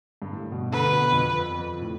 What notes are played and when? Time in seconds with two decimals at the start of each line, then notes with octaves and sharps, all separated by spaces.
0.22 G2
0.32 A2
0.52 B2
0.72 D3 B4
0.92 B2
1.12 F2
1.52 F2
1.82 A2